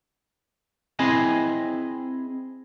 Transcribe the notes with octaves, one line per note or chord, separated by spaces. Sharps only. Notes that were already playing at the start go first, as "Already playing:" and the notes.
C4 E4 G#4 D#5 G#5